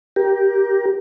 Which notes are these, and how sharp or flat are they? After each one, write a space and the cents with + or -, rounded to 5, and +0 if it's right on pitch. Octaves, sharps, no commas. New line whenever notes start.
G4 +0 A#4 +20